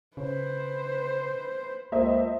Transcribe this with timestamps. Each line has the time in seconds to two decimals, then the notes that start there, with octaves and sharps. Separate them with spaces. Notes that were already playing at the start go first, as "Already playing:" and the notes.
0.17 C#3 B4 C5
1.92 C#2 A#3 C5 D#5 E5